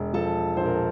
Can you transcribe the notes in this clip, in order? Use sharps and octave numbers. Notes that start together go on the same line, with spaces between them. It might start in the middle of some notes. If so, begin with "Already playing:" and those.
Already playing: E1
F3 A4 A5
A#1 C5
A#4
A4